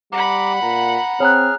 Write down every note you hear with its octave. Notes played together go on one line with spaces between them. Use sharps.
G3 F#5 A#5 B5 D6
A#2 A#5
C4 G#4 C#5 A#5 F6 F#6